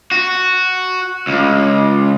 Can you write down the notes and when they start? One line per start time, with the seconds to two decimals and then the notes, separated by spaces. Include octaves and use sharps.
0.11 F#4
1.27 C#2